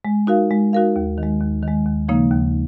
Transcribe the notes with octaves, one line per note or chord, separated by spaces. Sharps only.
G#3
D#4 F#4 A#4 F5
G#3
D#4 F#4 A#4 F5
D#2
D#3
G#3
D#2
D#3 G#3
D#2
C#3 F3 A#3 D#4
D#2